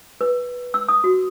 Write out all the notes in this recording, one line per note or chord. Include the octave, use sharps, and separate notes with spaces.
B4
E6
D#6
F#4